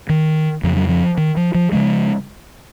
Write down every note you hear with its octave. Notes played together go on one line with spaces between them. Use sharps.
D#3
F2 C#3 F3
F#3
F3
D#3
F3
F3
C#3 F3 G#3